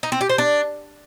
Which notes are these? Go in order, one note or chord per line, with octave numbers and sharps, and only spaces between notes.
D#4
C4
G4
C5
D4